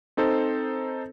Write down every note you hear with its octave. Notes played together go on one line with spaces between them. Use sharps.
C4 D#4 A4 C5